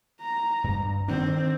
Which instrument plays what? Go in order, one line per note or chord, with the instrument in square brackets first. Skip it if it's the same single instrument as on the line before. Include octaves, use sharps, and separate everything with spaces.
[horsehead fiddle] A#5
[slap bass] G2
[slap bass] D#3 D4 [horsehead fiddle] C4